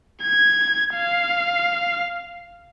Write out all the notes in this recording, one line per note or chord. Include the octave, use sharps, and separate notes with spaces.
G#6
F5